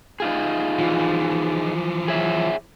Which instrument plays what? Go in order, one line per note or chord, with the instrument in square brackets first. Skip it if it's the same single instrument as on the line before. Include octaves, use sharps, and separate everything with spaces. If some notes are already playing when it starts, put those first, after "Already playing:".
[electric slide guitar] D#4 F4 G#4
[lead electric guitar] E3 F3
[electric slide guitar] G#4 C#5 E5